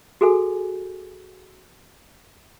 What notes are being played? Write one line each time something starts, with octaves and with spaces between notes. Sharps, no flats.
F#4 G#4 A4 G#5